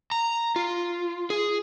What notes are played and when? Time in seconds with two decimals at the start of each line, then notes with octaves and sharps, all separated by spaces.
0.11 A#5
0.56 F4
1.30 G#4